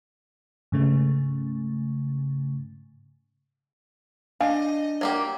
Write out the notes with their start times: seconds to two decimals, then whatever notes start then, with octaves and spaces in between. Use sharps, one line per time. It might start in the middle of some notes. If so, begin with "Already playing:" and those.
0.72 G#2 C#3 A3
4.41 D4 D#5 F5 G#5
5.01 F#3 A#3 G4